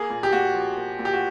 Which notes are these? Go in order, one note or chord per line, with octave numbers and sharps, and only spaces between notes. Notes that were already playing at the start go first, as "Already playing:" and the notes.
Already playing: A#3 G#4
A#2
G4
A#2 F#4
F3
A#3
A#2
G4
F#4